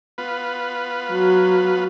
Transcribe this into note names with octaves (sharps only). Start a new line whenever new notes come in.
B3 F4 B4
F#3